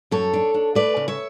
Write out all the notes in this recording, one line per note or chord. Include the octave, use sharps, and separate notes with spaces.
F#2 A4 C#5
D4
D4
A3 B4 D5
C#3
C#5 E5